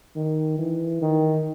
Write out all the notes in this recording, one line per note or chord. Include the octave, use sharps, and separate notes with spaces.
D#3
E3
D#3